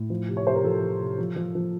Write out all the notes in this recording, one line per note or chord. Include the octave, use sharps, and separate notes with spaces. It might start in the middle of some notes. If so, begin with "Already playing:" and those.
Already playing: A2
F3
C3
C#5
C3 C5
A#4
F3 A4
F3
C3
F3
F3
F3